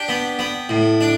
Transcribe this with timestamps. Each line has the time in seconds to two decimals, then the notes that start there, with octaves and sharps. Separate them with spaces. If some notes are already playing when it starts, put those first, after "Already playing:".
Already playing: D4 G4 G5
0.09 B3
0.39 B3
0.69 A2
1.01 D4